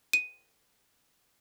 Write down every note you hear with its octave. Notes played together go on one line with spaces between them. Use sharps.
D#7